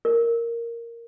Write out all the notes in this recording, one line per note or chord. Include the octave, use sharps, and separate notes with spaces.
A#4